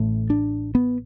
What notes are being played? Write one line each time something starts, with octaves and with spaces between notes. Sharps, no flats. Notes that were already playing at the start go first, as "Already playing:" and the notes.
Already playing: A1 A2 A3
D4
B3